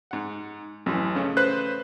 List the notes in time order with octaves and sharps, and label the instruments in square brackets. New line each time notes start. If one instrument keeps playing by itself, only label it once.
[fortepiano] G#2 F#5
[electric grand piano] A1 [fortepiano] F#2 E3
[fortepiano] C#3 A3 C#4
[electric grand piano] B4 C5 F#6